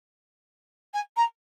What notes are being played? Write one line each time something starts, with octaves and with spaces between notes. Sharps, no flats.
G#5
A#5